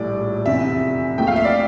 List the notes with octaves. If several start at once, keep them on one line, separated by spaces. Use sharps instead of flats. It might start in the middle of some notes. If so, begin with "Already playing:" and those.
Already playing: A#1 A2 G3 D5
F1 E2 C3 E5
A#1 A#2 A3 G5
F5
E5
D5